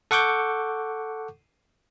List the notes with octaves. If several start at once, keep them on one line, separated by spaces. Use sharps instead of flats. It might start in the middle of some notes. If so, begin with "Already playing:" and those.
A4 F#5 C#6 D6 G6